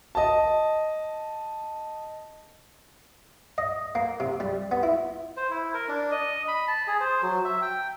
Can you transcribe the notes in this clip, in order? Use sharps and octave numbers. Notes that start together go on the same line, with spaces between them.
D#5 A5
D#5
A#3
C3
G3
B3
E4
C5
E4
A#4
D4
D#5
B5
A5
G#4
C5
F#3
E5
G5